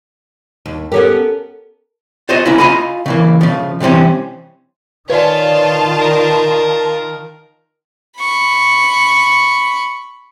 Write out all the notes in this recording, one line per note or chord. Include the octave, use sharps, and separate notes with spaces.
D#2
B3 C#4 G4 A4 A#4
F4 C5 C#5 D#5
A#3 C#4 E4
F4 D#5 G#5 A#5 B5
C#3 E3 A#3
C#3 F3
C3 E3 G3 C4 C#4
D#3 F4 B4 C#5 D5 A5
A#4
B5 C#6